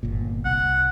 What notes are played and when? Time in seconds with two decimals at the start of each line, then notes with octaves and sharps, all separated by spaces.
0.03 G1 A#2
0.45 C2 F#5